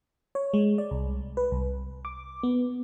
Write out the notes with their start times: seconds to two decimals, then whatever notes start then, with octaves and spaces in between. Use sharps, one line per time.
0.35 C#5
0.54 G#3
0.78 D5
0.91 C2
1.37 B4
1.52 C2
2.05 D6
2.43 B3